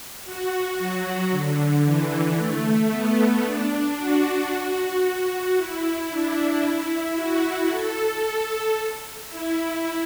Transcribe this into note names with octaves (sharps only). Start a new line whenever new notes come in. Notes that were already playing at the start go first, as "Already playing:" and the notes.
F#4
F#3
D3
E3
A3
B3
D4
F#4
F#4
F#4
E4
D4
E4
F#4
A4
A4
E4